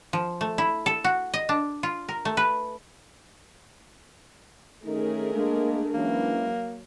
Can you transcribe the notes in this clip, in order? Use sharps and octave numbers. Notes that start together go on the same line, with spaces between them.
F3
A3
E4
A4
F#4
D#5
D4
F4
A#4
A3
B4
D#3 A3 C#4 D#4 G#4 A#4
G#3 A#3 D4
E3 F#3 G#3 A#3 C#4